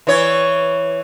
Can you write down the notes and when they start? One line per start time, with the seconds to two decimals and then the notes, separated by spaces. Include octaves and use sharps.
0.07 E3 C#5